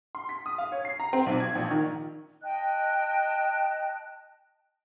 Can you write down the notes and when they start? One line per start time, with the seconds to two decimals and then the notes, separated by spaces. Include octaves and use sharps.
0.15 C6
0.29 B6
0.46 D#6
0.58 F5
0.72 C#5
0.85 C7
1.00 A#5
1.13 C4
1.26 B1
1.40 G#6
1.55 A#1
1.70 D#3
2.42 D#5 G5 A5 F#6